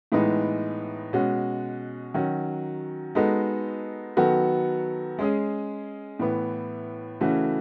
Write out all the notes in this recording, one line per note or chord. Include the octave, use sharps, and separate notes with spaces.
A2 E3 G#3 B3 D#4
B2 G#3 C#4 F#4
D#3 F#3 C#4 F#4
G#3 B3 D#4 F#4 A4
D#3 F#3 B3 F#4 A4
G#3 C#4 G#4
A2 E3 B3
C#3 E3 A3 C#4 F#4